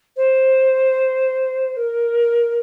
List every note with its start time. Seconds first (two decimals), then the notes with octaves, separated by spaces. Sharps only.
0.16 C5
1.76 A#4